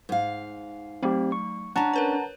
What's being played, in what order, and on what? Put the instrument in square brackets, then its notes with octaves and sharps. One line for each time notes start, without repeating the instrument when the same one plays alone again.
[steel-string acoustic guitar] G#2 F5
[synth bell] F#3 A3 D#4 [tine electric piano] C4 G4
[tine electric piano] C#6
[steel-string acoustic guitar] C#4 D4 [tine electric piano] F#5 A5 A#5
[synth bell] A#4 B4 C#5